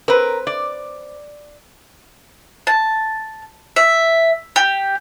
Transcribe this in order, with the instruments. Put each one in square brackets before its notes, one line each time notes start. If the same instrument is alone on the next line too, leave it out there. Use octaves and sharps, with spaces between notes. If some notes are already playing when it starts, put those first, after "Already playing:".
[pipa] C4 B4 [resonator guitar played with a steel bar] A#4
[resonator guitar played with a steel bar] D5
[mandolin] A5
E5
G4